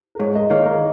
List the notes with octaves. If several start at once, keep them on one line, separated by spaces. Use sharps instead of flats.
A#4
G#2 G#4 C#5
A#4 D#5
D#3 A#3 C#5 F5
A#4 D#5